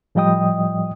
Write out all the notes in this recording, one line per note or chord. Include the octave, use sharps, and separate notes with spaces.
A2 F3 G3 D#5 G5 D#6